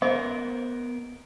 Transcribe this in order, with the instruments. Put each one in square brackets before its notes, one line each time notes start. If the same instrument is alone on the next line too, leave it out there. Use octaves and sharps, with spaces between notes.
[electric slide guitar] B3 A#4 [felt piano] C5 [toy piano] D#5